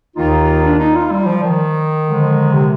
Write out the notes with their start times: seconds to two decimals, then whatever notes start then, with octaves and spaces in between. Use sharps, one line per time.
0.16 D#2 D#3 A#3 D#4 F4
0.63 D4
0.79 D#4
0.96 F4
1.12 G3
1.27 F3
1.43 D#3
2.06 D3 F3 G#3
2.53 C3